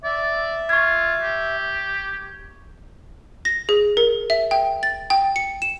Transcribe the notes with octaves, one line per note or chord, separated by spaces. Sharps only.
D5 E5
F4 C#6 G#6
G4
A#6
G#4
A#4
E5
G5
A6
G5
C#7
E7